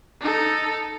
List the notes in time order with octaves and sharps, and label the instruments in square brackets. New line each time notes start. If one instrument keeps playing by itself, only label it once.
[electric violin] D#4 A4